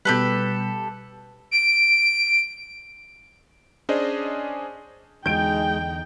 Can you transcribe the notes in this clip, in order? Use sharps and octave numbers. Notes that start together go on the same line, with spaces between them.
B2 G3 G4 A4 B4
D7
C#4 D4 G#4 C5 D5 D#5
E2 D3 G#3 D#4 G5 G6 D7